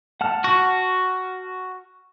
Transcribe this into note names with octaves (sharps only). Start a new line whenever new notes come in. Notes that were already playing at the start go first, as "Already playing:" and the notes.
F#5 A5 F6
F#4